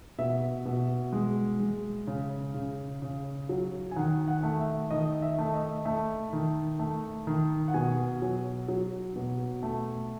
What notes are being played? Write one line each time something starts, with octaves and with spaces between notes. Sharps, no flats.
B2 E5
B2
G#3
G#3
C#3
C#3
C#3
F#3
G#5
D#3 F#5
F#5
A3
E5
D#3 D#5
E5
A3
D#5
A3 E5
D#3
A3
D#3
F#5
B2 G#5
F#3
F#3
B2
A3